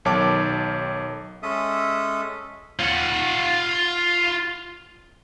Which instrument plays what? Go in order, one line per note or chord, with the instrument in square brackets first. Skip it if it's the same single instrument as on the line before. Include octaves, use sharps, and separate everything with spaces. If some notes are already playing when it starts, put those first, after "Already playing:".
[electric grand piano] B1 D#3 C#5 A5 D6
[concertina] G#3 C#4 A4 E5 D#6
[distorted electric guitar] F4 F#5